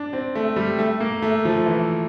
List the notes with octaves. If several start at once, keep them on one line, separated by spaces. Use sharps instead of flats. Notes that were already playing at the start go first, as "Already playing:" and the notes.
Already playing: D4
C4
A3
G3
A3
A#3
A3
F3
E3